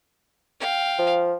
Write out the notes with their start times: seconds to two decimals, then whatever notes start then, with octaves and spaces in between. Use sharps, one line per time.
0.60 F5 G5
0.99 F3